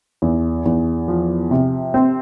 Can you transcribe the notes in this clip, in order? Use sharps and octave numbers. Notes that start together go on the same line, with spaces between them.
E2
E2
F3
C3
C4